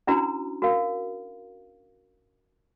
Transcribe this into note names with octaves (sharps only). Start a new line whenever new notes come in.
C#4 D4 E4 F#4 B4 A#5
F#4 A#4 F5